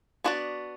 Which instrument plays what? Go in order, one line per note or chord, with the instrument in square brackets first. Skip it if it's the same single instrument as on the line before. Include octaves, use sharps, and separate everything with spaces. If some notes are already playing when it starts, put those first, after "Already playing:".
[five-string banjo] B3 D4 F#4 B4 D5